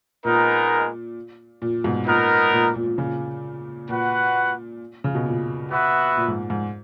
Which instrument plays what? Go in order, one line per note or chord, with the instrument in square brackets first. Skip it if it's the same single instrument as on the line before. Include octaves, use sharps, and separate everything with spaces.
[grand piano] A#2 [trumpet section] G#3 B3 D#4 A#4
[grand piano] A#2
G#2 B2
[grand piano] A#2 [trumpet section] B3 D#4 A#4
[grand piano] A#2
A#2
A#2
A#2 C#3
[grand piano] A#2 [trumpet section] F#4 B4 F#5
[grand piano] C#3
B2
A#2
[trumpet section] B3 F#4 B4 E5
[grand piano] A#2
G#2
G#2